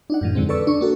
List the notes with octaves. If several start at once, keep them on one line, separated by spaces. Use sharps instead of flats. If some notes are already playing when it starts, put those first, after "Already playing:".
D4 D#4 F#5
F#2 A2 E3
F2 D3 G#3 C4
A4 B4 D5 C#6 E6
D4 C#6
A#3 F#4 A4